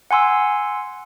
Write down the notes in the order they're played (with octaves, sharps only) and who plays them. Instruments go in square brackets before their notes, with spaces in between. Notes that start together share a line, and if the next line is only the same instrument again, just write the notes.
[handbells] F#5 G#5 C6 E6